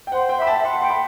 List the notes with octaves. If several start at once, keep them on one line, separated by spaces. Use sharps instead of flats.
G5
C5 F#5
G5
E5 B5
A5
E5
F#5 C6
G5 C6
B5